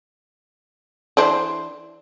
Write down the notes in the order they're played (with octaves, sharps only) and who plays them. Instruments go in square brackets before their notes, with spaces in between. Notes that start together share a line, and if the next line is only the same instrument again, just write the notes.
[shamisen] E3 D4 C5